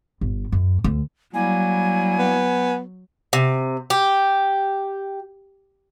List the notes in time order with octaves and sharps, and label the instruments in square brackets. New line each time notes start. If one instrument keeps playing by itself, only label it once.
[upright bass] G1
F#2
D2
[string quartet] F#3 [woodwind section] G3 A#3 E4 [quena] G#5
[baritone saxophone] B3
[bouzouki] C3
G4